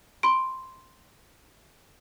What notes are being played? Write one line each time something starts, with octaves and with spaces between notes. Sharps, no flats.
B5 C6 D7